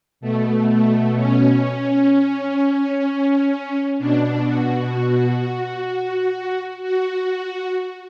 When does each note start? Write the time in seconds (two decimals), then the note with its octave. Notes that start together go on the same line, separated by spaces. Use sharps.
0.21 B2 A3
0.68 A3
1.16 C#4
1.63 C#4
3.99 B2 D4
4.46 F#4
6.83 F#4